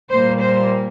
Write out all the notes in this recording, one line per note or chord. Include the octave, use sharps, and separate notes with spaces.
A#2 G3 A#3 C5
C5